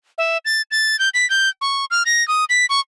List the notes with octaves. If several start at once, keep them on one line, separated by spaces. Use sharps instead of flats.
E5
A6
A6
G6
B6
G6
C#6
F6
A#6
D#6
B6
C#6